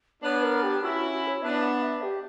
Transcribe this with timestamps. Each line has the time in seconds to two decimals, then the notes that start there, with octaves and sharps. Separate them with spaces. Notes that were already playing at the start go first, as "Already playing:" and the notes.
0.23 B3 D4 C#5
0.43 A#4
0.63 G4
0.83 C#4 E4 F#4
0.98 F#4
1.12 F#4
1.28 C#5
1.42 B3 D4 E5
1.62 F#5
1.82 E5
2.02 G4